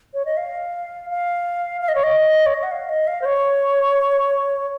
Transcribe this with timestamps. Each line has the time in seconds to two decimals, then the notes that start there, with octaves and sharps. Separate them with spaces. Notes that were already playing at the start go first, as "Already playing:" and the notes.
0.14 C#5
0.25 D#5
0.37 F5
1.10 F5
1.81 F5
1.89 D#5
1.95 C#5
2.03 D#5
2.46 C#5
2.54 D#5
2.63 F#5
2.71 F5
2.89 D#5
3.07 F5
3.22 C5
3.25 C#5